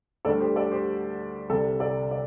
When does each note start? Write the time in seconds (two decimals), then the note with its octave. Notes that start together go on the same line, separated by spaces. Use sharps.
0.25 D2 D3 G3 A4 D5
0.40 G4 C5
0.56 A4 D5
0.71 G4 C5
1.49 C2 C3 G3 A4
1.80 A4 D5
2.11 D5